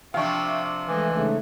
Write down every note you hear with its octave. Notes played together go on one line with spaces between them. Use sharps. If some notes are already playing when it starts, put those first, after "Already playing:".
C3 F3 D4 E5 F5 G5 C#6
E3 G#3 A3 D#5
G#2 C#3 A3